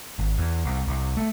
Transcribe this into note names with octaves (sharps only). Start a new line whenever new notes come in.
G#1
E2
C2
C2
A3